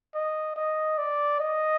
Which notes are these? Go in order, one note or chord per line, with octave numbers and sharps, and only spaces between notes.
D#5
D#5
D5
D#5